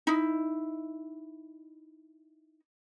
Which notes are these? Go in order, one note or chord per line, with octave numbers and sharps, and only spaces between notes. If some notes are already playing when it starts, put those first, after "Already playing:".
D#4 E4